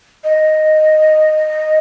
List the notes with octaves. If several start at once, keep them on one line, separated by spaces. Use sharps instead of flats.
D#5